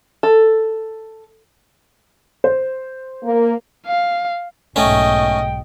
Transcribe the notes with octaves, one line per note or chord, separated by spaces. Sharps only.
A4
C5
A#3
F5
B1 G#2 A3 C#4 D#5 G5